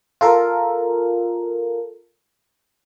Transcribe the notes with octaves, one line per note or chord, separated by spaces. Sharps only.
F4 A4 A#4